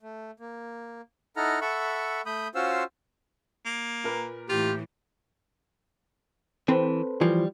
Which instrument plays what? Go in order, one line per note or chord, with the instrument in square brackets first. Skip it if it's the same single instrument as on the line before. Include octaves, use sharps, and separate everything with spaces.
[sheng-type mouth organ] A3
A#3
D#4 E4 A4 F#5 A#5 F6
A4 E5 F#5 B5 C#6
A3 B5 D#6 G6
C#4 F4 F#4 C5 F5 E6
[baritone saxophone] A#3
[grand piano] A#2 A#4 B4
[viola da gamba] A2 E3 [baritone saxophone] F4 [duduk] G4
[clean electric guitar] E3 [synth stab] C4 [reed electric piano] A4 B4 C5
[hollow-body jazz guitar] E3 F3 [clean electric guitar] G3